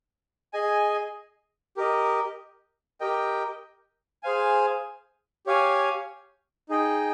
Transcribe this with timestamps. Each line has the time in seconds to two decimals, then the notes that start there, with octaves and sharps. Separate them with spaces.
0.53 G#4 D#5 G#5
1.77 G4 A#4 D#5
3.00 G4 A#4 D#5 G5
4.23 G#4 C5 F5 G#5
5.46 G4 C#5 F5 G#5
6.69 D#4 G#4 D#5 G5